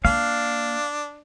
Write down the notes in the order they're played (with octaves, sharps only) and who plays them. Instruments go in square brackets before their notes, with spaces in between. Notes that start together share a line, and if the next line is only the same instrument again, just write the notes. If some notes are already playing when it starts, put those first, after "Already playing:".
[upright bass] A#3 [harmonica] D4 [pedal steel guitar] F5